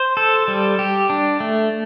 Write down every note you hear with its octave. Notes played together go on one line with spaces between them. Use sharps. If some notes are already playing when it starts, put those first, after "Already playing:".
Already playing: C5
A4
G3
G4
D4
A3